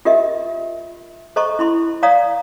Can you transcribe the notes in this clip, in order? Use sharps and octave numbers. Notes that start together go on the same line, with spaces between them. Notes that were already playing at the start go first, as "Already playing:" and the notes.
F4 G4 A#4 D#5 E5
A4 C5 D#5 A#5 C#6
E4 B5 C6
C#5 D5 F5 A#5 D#6